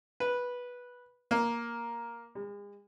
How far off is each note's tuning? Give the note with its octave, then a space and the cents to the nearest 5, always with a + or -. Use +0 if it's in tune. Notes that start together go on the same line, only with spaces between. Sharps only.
B4 -10
A#3 +5
G#3 -40